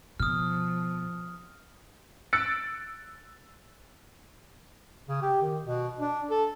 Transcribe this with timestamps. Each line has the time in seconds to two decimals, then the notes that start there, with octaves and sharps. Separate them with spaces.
0.20 B2 F3 D#6 F6
2.33 E6 F#6 A6 C#7 D7
5.09 C#3
5.22 G4
5.42 D#3
5.66 B2
5.99 D4
6.30 A4